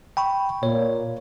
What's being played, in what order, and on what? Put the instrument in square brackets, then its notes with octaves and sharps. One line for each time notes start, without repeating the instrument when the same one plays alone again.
[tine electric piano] G5 B5 C#6
[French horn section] A#2 [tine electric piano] C#5